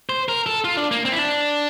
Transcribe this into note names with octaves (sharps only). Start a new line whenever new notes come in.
C5
A#4
A4
F4
D4
A#3
C4
E4
D4